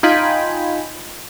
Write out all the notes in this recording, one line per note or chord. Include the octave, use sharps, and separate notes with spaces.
D#4 F4 G5 G#5 B5